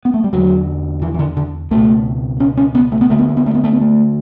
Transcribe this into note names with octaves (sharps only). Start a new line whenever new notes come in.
B3
A3
G3
E2 D3 F#3
E3
E3
D3
D3
C#2 B2 A3
C#4
C#4
B3
A3
B3
D2 D3 A3
B3
A3
B3
A3
B3
A3
B3
A3